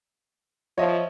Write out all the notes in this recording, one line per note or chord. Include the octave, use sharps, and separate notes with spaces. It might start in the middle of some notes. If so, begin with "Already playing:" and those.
F3 C#5 D#5 E5